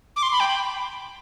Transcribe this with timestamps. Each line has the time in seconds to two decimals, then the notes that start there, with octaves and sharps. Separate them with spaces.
0.16 D6
0.23 C6
0.32 B5
0.40 G5